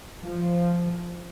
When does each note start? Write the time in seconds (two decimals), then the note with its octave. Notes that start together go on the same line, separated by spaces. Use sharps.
0.23 F3